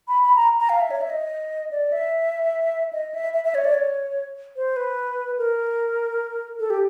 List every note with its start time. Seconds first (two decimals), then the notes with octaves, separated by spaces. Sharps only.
0.08 B5
0.23 B5
0.36 A#5
0.60 A#5
0.69 F5
0.81 E5
0.91 C#5
1.01 E5
1.10 D#5
1.71 D5
1.92 E5
2.93 D#5
3.14 E5
3.34 E5
3.45 E5
3.55 C#5
3.65 D5
3.74 C#5
4.56 C5
4.76 B4
5.38 A#4
6.60 A4
6.70 G4